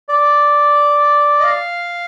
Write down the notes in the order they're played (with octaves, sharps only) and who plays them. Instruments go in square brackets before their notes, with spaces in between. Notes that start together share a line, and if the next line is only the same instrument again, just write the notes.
[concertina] D5
D#5
F5